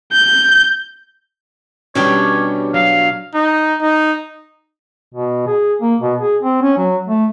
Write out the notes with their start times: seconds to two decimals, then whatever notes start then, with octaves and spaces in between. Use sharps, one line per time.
0.12 G6
1.95 B2 G3 C#4 D4 G4 C#5
2.74 F#3 F5
3.34 D#4
3.82 D#4
5.15 B2
5.47 G#4
5.82 A#3
6.01 B2
6.21 G#4
6.43 C4
6.62 C#4
6.78 F#3
7.08 A3